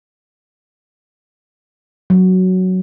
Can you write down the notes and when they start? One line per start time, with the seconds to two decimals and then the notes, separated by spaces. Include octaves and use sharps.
2.10 F#3